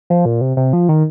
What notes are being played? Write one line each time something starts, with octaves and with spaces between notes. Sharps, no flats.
F3
A#2
C3
C3
F3
D#3